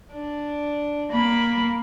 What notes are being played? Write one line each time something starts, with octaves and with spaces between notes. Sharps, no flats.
D4
A#3 B5